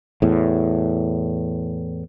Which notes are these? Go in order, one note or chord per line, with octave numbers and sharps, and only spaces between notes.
E2 A2